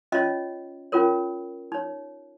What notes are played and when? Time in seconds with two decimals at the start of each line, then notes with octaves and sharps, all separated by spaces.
0.12 C#4 F4 C#5 D#5
0.92 C#4 F4 A#4 C#5
1.72 D#4 C#5